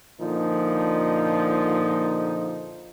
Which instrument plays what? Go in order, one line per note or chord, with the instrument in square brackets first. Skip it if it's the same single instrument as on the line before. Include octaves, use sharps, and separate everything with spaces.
[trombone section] A#2 D3 F3 D#4